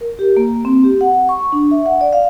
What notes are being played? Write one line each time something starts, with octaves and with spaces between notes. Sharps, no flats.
A#4
G4
A#3
C4
G4
F#5
C#6
D4
E5
F#5
D5
F5